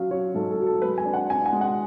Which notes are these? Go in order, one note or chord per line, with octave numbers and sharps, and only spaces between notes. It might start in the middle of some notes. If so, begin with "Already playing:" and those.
Already playing: F#3 C#4 F5
F#3 C#5
G#2 A4
A4
F#3
A4
G#3 B4
G#5
D4
F#5
D4 G#5
G#5
G#3
F#5